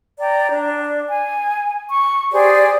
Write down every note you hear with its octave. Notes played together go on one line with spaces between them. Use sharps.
D5 G5 A#5
D4
G#5
C#6
G4 G#4 C5 D5